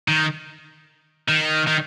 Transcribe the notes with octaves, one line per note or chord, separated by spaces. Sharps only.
D#3
D#3
D#3